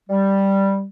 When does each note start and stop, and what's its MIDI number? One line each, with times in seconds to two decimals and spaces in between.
0.10 0.86 55